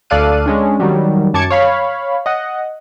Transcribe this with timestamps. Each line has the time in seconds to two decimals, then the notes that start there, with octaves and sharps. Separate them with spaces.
0.10 D2 A4 D5 F5 F#6 D#7
0.46 G#3 C#4 D4
0.80 D#3 F#3 G3
1.34 F#2 A5 D6 G#6 C#7
1.50 C#5 F5 B5
2.26 D#5 F#5